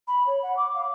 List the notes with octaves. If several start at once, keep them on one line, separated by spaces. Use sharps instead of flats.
B5
C#5
F#5
D6
F5